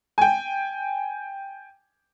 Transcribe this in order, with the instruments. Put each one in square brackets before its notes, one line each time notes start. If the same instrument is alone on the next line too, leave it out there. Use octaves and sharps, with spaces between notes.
[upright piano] G5 G#5